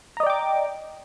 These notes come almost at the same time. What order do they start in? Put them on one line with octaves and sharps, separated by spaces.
A#5 D#5 D5 G5 D6